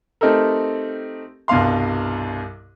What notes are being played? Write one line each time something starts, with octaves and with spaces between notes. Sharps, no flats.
A3 C4 D#4 G4 A4 A#4
C2 G2 B2 F5 C6